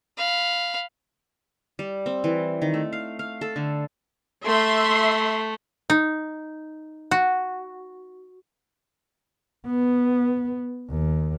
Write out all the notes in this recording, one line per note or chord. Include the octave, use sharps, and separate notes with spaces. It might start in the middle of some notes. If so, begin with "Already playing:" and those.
F5 B5
G3
C4
E3
D#3
A3
F5
F5
A4
D3
A3 E5 C6
D#4
F#4
B3
D#2